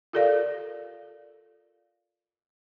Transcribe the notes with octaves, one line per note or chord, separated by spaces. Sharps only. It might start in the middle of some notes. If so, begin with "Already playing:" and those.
F4 G4 A4 A#4 D5 F5